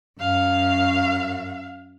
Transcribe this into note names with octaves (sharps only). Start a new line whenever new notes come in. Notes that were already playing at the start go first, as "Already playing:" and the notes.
F#2 F5